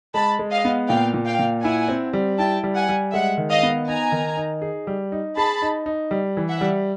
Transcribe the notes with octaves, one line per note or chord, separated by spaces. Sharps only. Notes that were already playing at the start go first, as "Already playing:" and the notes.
G#3 A5 B5
G#3
D#5 F5
B3
A#2 F5 G5
A#2
F5 G5
A#2
E4 F#5 G#5
C4
G3
E4 G5 A5
G3
F#5 G#5
G3
G#3 E5 F#5
D#3
D#5 F5
B3
D#4 G#5 A#5
D#3
D#4
G#4
G3
D#4
G#4 A5 B5
D#4
D#4
G3
E3
E5 F#5
G3